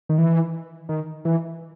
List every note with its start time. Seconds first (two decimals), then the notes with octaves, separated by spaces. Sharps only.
0.09 D#3
0.18 E3
0.89 D#3
1.25 E3